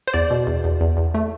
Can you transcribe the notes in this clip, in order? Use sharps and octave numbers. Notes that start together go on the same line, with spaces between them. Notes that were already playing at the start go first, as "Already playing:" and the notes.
C5
E2 D5
B2
E2
E2
E2
E2
A3